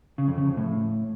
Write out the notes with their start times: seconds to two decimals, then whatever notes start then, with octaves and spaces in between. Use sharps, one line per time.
0.18 C#3
0.28 F2
0.38 C#3
0.48 F2
0.57 A2